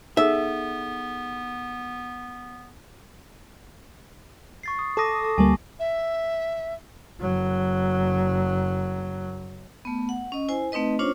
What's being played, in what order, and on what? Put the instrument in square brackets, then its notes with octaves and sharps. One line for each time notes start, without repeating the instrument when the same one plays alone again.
[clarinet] B3 [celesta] D#4 G#4 A4 [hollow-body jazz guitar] E5
[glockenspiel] C#6 A6 C7
D#6
[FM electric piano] A4 D#6 [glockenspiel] A5 D6 A#6
[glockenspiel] A5
[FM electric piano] D2 G3 A#3 [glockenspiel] G#5
[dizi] E5
[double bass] F#1 F#3
[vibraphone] A3 B3
F#5
C#4 D#5
E4 C5 G#5
A3 C4 D#4 B4 D#5
C#4 D4 F4 C5 C#5